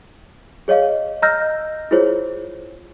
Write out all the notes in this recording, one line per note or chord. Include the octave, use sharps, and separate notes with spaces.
G#4 C#5 D#5 F5
D#5 A#5 E6 F6 G6 A#6
E4 F4 G#4 C5 C#5